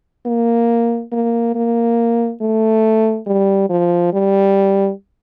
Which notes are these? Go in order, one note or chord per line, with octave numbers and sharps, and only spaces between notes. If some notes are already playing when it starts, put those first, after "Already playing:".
A#3
A#3
A#3
A3
G3
F3
G3